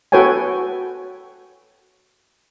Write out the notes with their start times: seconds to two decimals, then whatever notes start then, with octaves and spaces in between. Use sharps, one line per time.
0.12 F#4 A4 B4 C#5 G5 G#5